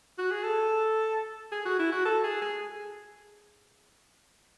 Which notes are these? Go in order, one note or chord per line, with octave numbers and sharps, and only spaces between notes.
F#4
G#4
A4
G#4
F#4
E4
F#4
A4
G#4
G#4